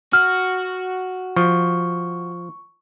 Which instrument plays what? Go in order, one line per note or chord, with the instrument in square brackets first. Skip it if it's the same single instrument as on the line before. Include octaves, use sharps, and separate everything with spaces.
[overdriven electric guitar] F#4 [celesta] F6
[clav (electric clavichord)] F3 [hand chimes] C#6